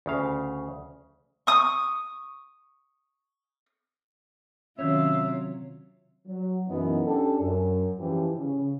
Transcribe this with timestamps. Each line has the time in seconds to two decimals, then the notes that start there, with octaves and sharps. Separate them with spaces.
0.06 D2 C#3 F5
1.47 C#6 D#6
4.79 C3 D#3 F#3 C#4 F4 C#5 E5
6.26 F#3
6.68 F#2 B2 E3 B3 D#4
7.05 C#4 D4 G4 A4
7.40 F#2
7.99 G#2 E3 F3 C#4 G4
8.37 C#3